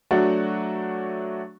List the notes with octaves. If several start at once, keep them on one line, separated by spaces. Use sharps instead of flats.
F#3 A3 D4 F#4